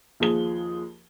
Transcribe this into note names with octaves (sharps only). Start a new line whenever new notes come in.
D#2 F3 G#4 G7